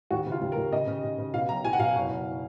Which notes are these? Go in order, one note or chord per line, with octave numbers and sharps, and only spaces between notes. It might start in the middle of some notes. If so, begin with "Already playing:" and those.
D#2 F#4
C#3
F4
D#2
A#4
D#2
C#3 D#5
C#3
C#3
C#3
B2 F5
B1 A#5
B2 G#5
F#5
B2 F5
F#1
F#1